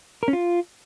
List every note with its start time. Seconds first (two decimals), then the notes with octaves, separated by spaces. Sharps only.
0.23 A#4
0.28 C#4
0.33 F4